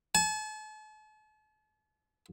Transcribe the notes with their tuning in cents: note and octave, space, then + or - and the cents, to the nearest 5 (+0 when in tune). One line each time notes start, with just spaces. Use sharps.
A5 -40